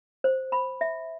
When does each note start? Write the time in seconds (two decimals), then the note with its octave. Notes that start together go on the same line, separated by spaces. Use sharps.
0.24 C5
0.52 B5
0.81 E5